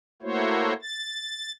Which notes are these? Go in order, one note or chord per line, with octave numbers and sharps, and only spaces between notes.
A3 A#3 E4 F#4 C5 C#5
A6